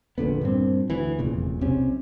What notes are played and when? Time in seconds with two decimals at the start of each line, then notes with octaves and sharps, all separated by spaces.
0.18 A#1 A#2 D3 B3
0.41 G2 A#2 C4
0.90 D2 E3
1.19 F1 E2 A#2 C#3
1.61 B1 C3 C4 C#4